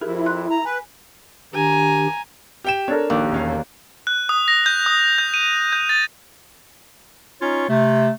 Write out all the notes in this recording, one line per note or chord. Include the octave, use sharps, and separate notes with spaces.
F2 E4 G4 G#4 A#4
C6 F#6
A#5
B4 G#5
D#3 D4 G4 G#5 A#5
G4 G5 E7
D4 A4 A#4 C#5
A#1 D#2
E1 C#4 F5
F#6
D#6
A#6
G6
D#6
G6
D#7
G6
A6
C#4 D#4 F4 C#5
C3 A3